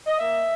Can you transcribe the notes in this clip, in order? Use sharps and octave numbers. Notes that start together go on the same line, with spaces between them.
D#5
A#3 E5